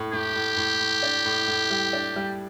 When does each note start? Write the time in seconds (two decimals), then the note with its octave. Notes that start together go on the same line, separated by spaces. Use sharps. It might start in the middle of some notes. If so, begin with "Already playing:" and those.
Already playing: A2
0.12 A2 G4
0.36 A2
0.57 A2
0.81 A2
1.03 D4
1.26 A2
1.48 A2
1.70 G3
1.93 D4
2.16 G3